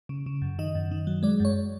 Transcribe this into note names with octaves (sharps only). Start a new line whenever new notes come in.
C#3
C#3
F#2
D#3 D#5
F#2
D#3
F#3
G#3 D5
F#2 C#5